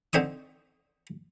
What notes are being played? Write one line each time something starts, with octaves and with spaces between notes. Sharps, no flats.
D3 C4 D#4 C#6 D#6